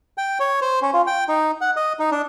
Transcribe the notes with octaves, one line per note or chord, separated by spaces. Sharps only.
G5
C#5
C5
C#4
F4
G5
D#4
F#5
D#5
D#4
D4